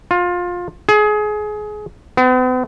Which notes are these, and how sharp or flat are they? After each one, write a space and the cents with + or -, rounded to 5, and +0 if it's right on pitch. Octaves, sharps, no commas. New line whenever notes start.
F4 +20
G#4 +25
B3 +45